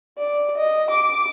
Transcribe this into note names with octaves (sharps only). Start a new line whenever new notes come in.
D5
D#5
D6